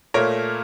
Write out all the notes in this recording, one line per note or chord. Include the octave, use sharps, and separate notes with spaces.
A#2 A3 A#4 C#5